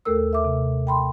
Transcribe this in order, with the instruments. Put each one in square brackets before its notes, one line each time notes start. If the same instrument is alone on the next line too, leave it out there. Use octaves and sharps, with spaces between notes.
[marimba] D#2 A3 A4 A#4 E6
E5 D6
C3
G5 B5 C6